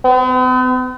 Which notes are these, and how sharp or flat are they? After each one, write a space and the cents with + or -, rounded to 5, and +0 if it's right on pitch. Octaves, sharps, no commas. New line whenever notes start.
B3 +45